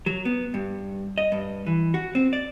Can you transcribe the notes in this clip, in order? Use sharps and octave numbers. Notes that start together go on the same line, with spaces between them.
F#3
B3
G2
D#5
G2
E3
F#4
C4
D5